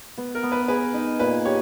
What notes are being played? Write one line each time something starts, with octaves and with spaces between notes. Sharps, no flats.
B3
A#4
B3
B4
G#4 B4
D#4
A#2 B4
G4 C#5